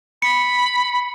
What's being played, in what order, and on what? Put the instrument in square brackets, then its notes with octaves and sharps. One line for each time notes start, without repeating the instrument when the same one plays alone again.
[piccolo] B5 [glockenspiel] C#7